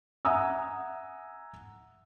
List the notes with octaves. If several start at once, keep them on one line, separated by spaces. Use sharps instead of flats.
E5 F#5 G#5 A#5 D#6 E6